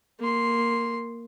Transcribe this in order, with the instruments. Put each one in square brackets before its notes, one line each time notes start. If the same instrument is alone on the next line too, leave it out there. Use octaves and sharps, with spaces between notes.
[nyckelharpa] A#3 C6